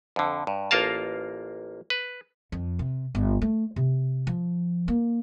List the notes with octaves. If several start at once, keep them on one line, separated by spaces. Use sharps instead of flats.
F2 D3
G2
A1 A#3 F4 A#4 F5 A5
B4
F2
C3
G1
A3
C3
F3
A#3